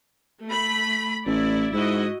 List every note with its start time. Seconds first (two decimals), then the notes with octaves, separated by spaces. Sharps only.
0.44 A3 B5
1.26 A1 E4 D5
1.73 G#2 E4 F#4 D#5